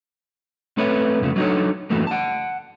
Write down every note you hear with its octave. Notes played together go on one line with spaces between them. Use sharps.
A3 C4 A4 B4 C#5 E5
C2 F2 C#3 A3
F#3 D4 D#4 G4 A4 C#5
F#2 E3 F#3 A3 A#3
F#5 A5